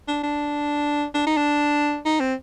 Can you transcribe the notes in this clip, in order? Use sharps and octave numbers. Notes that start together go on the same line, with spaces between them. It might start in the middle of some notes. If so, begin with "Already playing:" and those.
D4
D4
D4
D#4
D4
D#4
C4